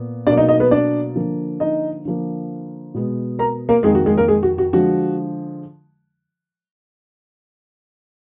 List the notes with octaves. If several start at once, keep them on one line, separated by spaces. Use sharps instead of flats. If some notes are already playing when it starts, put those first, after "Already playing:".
Already playing: A#2 B3
B2 F#3 A#3 D4 D5
D#4 D#5
D#4 D#5
B3 B4
D4 D5
D3 F3 A#3
D#4 D#5
D3 F3 A#3
B2 G#3 B3
A#4 A#5
A#3 A#4
F2 D#3 G#3 A#3 G#4
F#4
G#3 G#4
A#3 A#4
G#3 G#4
F#4
F#4
D3 F3 G#3 F#4